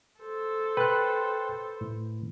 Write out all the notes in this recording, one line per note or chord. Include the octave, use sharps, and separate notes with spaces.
A4 C5
B4 G5 C6 F#6
A2